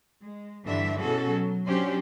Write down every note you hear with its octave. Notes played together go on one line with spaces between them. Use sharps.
G#3
G2 D3 E3 G3 D4 E5
B2 E3 C#4 F#4 G#4 A4
F#3
F#3 C#4 D4 G4 C5